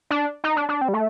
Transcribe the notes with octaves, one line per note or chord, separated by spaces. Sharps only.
D4
D#4
D4
D4
C4
G3
A3